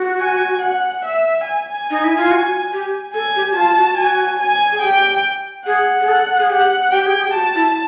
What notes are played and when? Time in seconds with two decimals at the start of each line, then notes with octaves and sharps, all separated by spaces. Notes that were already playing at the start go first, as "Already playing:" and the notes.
Already playing: F#4
0.21 G#5
0.62 F#5
1.05 E5
1.47 G#5
1.90 D#4
2.04 E4
2.17 F4
2.31 F#4
2.72 G4
3.14 A4 G#5
3.36 G4
3.52 F#4
3.56 F4 A5
3.77 F#4
3.98 F#4 G#5
4.40 G#5
4.72 G#4
4.82 G4 G5
5.66 G#4 F#5
6.01 G#4
6.08 A4
6.38 G#4
6.50 G4 F#5
6.92 G4 G5
7.06 G#4
7.20 G4
7.34 F#4 A5
7.55 E4